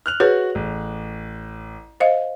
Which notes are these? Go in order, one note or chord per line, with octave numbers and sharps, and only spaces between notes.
F6 F#6 F7
F#4 G#4 B4 C#5
A1
C5 D#5 F5